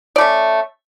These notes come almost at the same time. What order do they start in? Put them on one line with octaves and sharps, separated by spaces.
D5 A3 C#4